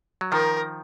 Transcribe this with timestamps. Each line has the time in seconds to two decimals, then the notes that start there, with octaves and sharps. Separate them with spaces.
0.21 F#3
0.32 D#3 F3 A#4